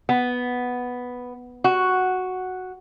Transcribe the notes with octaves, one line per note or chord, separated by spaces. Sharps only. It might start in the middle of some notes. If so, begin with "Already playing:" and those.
B3
F#4